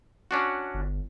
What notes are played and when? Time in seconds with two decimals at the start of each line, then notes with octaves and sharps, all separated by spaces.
0.31 C#4 D4 F#4
0.74 G1